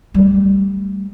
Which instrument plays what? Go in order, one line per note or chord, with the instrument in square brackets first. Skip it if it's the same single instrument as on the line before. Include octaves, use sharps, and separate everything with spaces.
[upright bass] G3 A3